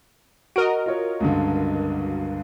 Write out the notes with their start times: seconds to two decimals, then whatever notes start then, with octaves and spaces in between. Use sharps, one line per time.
0.56 F#4 A#4 D#5 D7
0.86 F4 C#5
1.20 C#2 G2 D3